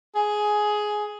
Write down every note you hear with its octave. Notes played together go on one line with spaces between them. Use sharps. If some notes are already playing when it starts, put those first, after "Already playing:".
G#4